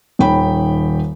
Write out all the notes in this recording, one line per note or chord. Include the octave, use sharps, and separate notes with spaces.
D#1 D#3 C#5 G5 B5